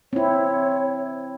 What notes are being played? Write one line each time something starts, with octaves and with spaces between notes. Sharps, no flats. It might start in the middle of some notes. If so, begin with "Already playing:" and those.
C4 E4 C#5